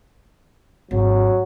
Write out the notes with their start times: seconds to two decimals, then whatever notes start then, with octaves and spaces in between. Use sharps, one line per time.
0.91 G#1 F#3